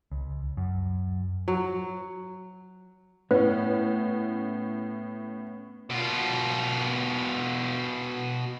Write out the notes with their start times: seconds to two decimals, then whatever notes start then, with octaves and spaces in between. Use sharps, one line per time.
0.11 C#2
0.57 F#2
1.48 F#3
3.31 A2 B3 C#4 B4 C#5
5.90 B2 F4